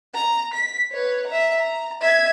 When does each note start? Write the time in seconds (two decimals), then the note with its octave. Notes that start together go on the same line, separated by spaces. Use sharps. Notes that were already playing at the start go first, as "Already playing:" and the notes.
0.14 A#5
0.54 B6
0.92 B4 C#5
1.27 E5 A#5
1.59 A#5
2.01 E5 G#6